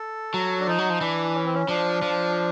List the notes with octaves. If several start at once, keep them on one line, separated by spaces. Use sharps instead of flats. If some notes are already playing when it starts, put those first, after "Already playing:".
Already playing: A4
F#3
D4
F3 D#4
F#3
F3
E3 D4
C#4
C4
C#4
F3 D4
F3